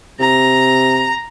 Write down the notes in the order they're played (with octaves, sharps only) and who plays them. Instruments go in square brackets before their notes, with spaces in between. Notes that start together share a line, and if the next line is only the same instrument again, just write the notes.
[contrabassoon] C3 [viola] A#5